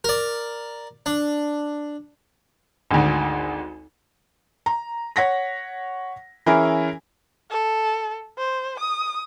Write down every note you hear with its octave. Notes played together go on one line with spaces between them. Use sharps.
A#4 D5
D4
G#1 D2
A#5
C#5 F#5 A#6 B6
E3 C#4 E4 G#4 A#4
A4
C5
D#6